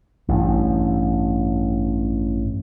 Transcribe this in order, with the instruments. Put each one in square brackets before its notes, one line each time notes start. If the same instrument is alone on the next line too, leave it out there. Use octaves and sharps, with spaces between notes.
[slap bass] A1 G2